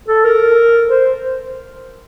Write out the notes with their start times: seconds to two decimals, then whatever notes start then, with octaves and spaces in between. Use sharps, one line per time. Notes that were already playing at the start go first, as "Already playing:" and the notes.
0.08 A4
0.24 A#4
0.89 C5